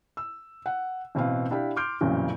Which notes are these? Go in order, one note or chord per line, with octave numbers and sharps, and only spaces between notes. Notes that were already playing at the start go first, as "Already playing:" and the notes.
E6
F#5
A1 B2 C4 B4 F5
D4 E4 G4 F5 B5
C6 D6 F6 G6 D7
A1 F2 A#2 C#3 F#3